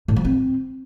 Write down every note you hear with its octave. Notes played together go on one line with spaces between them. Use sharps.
A2
F3
C4